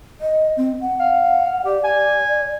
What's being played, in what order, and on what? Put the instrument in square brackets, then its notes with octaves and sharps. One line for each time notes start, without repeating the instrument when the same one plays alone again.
[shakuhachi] D#5
C4
F#5
[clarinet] F5
[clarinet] G4 [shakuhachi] D5
[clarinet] G#5